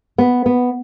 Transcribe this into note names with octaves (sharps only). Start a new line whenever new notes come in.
B3
B3